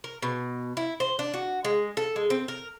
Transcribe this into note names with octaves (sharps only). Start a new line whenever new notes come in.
A#4
B2
E4
C5
D4
F#4
G#3
A4
G#3
C4
A#4